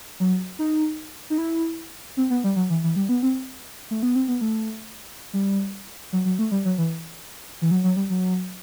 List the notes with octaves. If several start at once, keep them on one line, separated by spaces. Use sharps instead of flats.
F#3
D#4
D#4
E4
C4
B3
G3
F#3
E3
E3
G3
B3
C4
A3
B3
C4
B3
A3
G3
F#3
F#3
A3
G3
F#3
E3
E3
F#3
F#3
G3
F#3